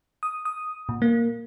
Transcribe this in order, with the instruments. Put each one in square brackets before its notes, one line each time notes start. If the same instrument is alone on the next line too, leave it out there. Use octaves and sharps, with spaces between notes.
[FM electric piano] D#6
D#6
A#2
A#3